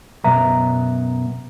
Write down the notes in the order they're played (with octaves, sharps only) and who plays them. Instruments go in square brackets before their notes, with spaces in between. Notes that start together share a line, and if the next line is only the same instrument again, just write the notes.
[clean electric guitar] F#2 B2 B3 E5 A#5